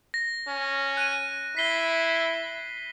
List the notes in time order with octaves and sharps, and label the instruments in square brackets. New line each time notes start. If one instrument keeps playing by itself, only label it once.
[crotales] A#6
[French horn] C#4
[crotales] F#6 D#7
[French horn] E4 [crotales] B6 C7 G7